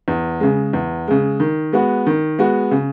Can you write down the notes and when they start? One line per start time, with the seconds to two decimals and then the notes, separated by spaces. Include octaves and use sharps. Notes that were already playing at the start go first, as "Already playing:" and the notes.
0.08 E2
0.40 C#3 G#3
0.73 E2
1.08 C#3 G#3
1.40 D#3
1.73 G#3 B3 F#4
2.07 D#3
2.39 G#3 B3 F#4
2.71 C#3